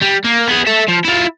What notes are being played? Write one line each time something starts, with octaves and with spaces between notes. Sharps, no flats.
G3
A#3
B3 G#4
A4 E5
F3
E4 F4